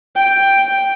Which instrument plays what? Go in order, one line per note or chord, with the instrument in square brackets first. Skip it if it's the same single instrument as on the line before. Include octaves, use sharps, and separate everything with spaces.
[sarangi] G5